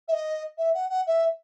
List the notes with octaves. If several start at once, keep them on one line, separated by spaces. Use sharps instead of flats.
E5
D#5
E5
F#5
F#5
E5